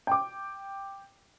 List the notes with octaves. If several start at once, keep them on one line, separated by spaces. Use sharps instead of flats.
G5 D6